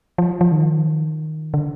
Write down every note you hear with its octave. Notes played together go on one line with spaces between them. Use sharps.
F3
F3
D#3
D3